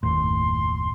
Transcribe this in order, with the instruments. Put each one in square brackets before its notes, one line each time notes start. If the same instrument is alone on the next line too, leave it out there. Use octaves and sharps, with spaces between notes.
[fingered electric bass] F#1 D#2 A2 [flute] C6